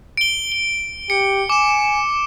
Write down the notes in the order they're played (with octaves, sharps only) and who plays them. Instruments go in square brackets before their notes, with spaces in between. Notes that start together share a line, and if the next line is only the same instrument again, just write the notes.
[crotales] D7 G7
G7
[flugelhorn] G4 [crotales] C#7
[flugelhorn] G#5 [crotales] D6 E7